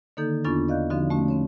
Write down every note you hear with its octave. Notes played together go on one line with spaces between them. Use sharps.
D3 D#3 A#3 D#4 A4 G6
E2 B3 D4 F4 C#6 A6
D5 D#5 F5 F#6 G6
D3 F3 C4 D#4 F#4
A3 C#4 F#4
C4 C#4 C#5